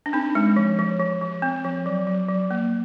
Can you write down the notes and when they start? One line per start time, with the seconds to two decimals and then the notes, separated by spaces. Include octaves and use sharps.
0.06 D4
0.13 C4 D#4
0.35 G#3
0.56 F3
0.79 F3
1.00 F3
1.21 F3
1.42 C4
1.64 F3
1.86 F#3
2.07 F#3
2.29 F#3
2.51 A#3